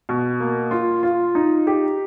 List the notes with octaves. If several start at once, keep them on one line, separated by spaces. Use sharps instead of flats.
B2
A#3
F4
F4
D#4
G4